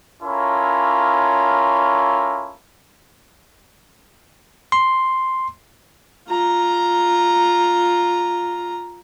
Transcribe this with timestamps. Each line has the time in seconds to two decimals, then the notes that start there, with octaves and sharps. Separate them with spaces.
0.22 C#4 E4 F4 A4 A#4 C#5
4.72 C6
6.28 F4 A#5